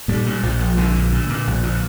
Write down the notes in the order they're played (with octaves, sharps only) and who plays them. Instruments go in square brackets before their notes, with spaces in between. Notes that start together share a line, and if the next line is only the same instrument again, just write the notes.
[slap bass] A#2 G3
A#2
A#1 F3
A#1
A#1 D3
A#2
A#2
A#2
A#1
A#2